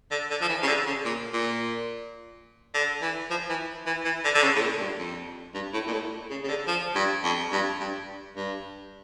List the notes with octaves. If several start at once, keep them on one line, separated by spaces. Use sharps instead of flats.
D3
D3
F3
E3
C#3
D3
C#3
A#2
A#2
D3
E3
F3
E3
E3
E3
D3
D3
C#3
A2
A#2
G2
F2
G2
A2
A#2
A2
C#3
C#3
D3
F3
G2
F2
G2
G2
G2